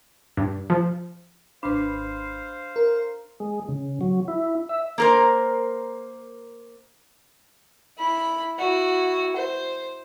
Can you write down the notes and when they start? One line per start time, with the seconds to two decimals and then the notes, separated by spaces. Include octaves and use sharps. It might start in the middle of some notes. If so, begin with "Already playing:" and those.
0.37 G2
0.70 F3
1.63 G#1 D4 B4 C5 F5 B5
2.76 A#4
3.40 G#3
3.69 C#3
4.01 F#3
4.28 E4
4.69 E5
4.98 A#3 A#4 C5
7.98 E4 B5
8.57 E4 F#4
9.37 C5